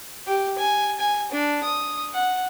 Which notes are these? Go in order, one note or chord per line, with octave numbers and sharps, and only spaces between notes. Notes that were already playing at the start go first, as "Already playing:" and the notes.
G4
G#5
G#5
D4
D#6
F#5